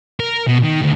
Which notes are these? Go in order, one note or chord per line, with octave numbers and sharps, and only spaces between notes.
A#4
B2
D#3
D2